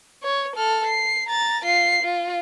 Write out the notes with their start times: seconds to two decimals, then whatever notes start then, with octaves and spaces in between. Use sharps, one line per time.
0.23 C#5
0.56 A4 F6
0.87 C7
1.28 A#5 A6
1.64 F4 C7
2.02 F4